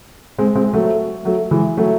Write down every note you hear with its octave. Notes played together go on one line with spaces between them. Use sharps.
G#3 C4
G#3 C4
F#3 A3
F#3 A3
E3 G#3
F#3 A3